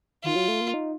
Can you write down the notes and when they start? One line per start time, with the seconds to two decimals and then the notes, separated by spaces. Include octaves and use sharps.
0.23 D#3 F4
0.36 F#3
0.48 A3
0.61 A#3
0.74 D#4